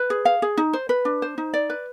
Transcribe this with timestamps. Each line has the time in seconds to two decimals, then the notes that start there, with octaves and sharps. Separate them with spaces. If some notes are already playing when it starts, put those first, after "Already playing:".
Already playing: B4
0.10 G#4
0.25 F5
0.42 G#4
0.57 D#4
0.73 C5
0.89 B4
1.05 D4
1.22 C5
1.38 D#4
1.54 D5
1.70 B4